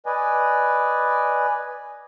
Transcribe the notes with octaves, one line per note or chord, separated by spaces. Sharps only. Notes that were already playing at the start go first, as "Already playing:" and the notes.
B4 D5 D#5 G#5